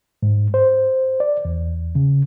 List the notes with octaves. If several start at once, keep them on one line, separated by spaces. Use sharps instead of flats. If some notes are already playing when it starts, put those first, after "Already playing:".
G#2
C5
D5
E2
C#3